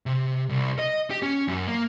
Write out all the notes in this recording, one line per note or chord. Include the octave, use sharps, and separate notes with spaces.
C3
C2
D#5
G4
C#4
F#2
A#3